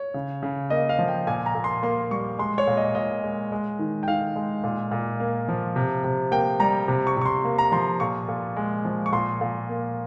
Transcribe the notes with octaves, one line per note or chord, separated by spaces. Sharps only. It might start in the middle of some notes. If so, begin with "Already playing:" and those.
Already playing: C#5
C#3
C#3
A#3 D#5
F5
F3
G5
A#2 G#5
A#5
A#2
C6
A#3 C6
G3 C#6
G#3 C6
C#5
A#2
D#5
A#2 D#5
G#3
G#3
D#3
G5
D#3 F5
G#3
A#2
A#2
A#3
F3
C3
C3
A#3 G5
G3 A#5
C3
C#6
C3 C#6
C6
A#3
A#5
F3 C6
A#2 C#6
A#2
G#3
F3
C#6
A#2 C6
A#2
A#3